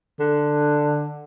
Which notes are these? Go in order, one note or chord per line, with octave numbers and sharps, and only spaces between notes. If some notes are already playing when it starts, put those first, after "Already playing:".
D3